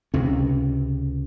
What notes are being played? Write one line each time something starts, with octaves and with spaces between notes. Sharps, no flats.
C#2 C3 C#4